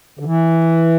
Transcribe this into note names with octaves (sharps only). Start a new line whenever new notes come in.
D3
E3